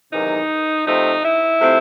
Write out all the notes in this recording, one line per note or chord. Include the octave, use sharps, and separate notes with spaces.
E2 C3 D#3 F#3 D#4
C3 F3 A3 C4 D#4
E4
C3 F3 A3 C4